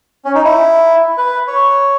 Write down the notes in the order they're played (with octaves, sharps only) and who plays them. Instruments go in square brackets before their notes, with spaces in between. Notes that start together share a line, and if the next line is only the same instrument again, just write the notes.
[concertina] C#4
D#4
E4
B4
C#5